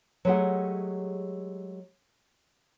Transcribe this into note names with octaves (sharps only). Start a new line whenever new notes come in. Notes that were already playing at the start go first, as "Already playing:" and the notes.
F#3 G#3 A3 G4 G#4 F#5